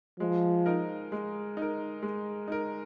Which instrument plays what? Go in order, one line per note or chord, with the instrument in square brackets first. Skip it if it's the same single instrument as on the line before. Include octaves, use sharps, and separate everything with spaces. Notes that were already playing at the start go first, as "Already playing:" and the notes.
[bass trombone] F3 [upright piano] G#3
[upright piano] D#4 A#4
G#3
D#4 A#4
G#3
D#4 A#4